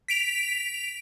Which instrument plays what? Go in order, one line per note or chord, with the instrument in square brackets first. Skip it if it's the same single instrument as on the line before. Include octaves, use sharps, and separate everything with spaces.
[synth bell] B6 D7 F7